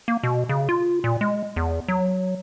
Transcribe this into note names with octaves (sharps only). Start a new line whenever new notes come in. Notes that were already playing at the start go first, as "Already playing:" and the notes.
A#3
B2
C#3
F4
A#2
G#3
E2
F#3